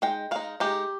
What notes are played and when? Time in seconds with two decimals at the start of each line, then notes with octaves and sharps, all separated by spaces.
0.02 G#3 D#4 G5
0.31 G#3 D#4 F5
0.60 G#3 D#4 G4